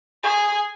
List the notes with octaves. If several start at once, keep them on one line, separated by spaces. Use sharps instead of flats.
G#4